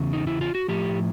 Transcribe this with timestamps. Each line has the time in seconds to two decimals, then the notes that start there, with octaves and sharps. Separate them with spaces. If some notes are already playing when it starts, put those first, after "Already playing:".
Already playing: E2 C#3
0.13 D#4
0.27 E4
0.41 F4
0.55 F#4
0.68 A2 F3 G4